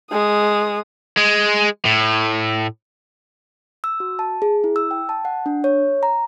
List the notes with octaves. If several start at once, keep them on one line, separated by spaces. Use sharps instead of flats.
G#3 D#6
G#3
A2
E6
F#4
A5
G#4
E4
E6
G5
A5
F#5
D4
C#5
A#5